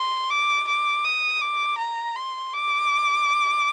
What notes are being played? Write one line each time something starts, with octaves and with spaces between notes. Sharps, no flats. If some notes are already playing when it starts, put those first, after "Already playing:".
Already playing: C6
D6
D6
D#6
D6
A#5
C6
D6